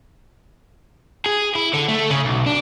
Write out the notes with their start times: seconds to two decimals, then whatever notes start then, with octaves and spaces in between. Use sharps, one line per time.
1.26 G#4
1.55 E4
1.74 D3
1.89 A3
2.10 C#3
2.25 B1
2.47 D4